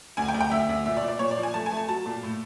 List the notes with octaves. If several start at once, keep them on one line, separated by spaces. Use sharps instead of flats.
D2 G#5
G5
D2
G5
D2 E5
D2
A#2 E5
D5
A#2
D5
A#2 C#5
D5
F3
G#5
A3 A5
G#5
A3
A5
F#3 A5
A#2
A2